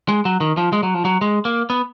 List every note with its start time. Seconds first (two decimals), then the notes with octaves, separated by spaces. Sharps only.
0.08 G#3
0.25 F#3
0.40 D#3
0.57 F3
0.73 G#3
0.83 F#3
0.94 F3
1.05 F#3
1.21 G#3
1.45 A#3
1.70 B3